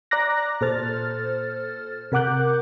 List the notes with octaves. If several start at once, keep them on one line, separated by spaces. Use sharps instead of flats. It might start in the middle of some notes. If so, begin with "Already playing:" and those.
D5 A#5 D6 F#6 A#6
A#2 A4 C5 F6 A6
C3 A#4 F#5 D6 F#6 G6